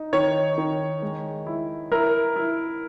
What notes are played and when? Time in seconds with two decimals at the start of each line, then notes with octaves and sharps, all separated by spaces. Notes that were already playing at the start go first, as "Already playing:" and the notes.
Already playing: D#4
0.13 D#3 C#5
0.58 D#3
1.02 G#3
1.47 E4
1.92 E4 A#4
2.36 E4